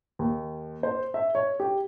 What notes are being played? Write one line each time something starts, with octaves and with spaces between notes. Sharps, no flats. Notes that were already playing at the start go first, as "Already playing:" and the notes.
D#2
C5
E5
C#5
G4